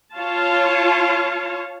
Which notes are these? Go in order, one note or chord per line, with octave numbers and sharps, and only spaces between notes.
F4 C#5 F5 A5